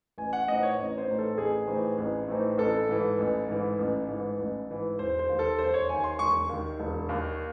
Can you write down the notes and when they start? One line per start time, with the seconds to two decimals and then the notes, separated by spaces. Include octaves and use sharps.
0.18 A1 G#5
0.33 F#5
0.48 A2 E3 C4 D#4 D#5
0.63 C#5
0.78 A1
0.98 C5
1.08 A2 E3 C4 D#4
1.18 A4
1.38 A1 G#4
1.67 A2 E3 C4 D#4
1.98 A1
2.28 A2 E3 C4 D#4
2.58 A1 A4
2.89 G#2 E3
3.18 A1
3.49 G#2 E3
3.79 A1
4.08 G#2 E3
4.38 A1
4.69 G#2 E3
4.99 E1 C5
5.19 C5
5.29 D#2 D#3
5.39 A4
5.58 E1 C5
5.74 C#5
5.89 D#2 D#3 G#5
6.04 C6
6.19 E1 C#6
6.49 D#2 D#3
6.80 E1
7.09 D#2 D#3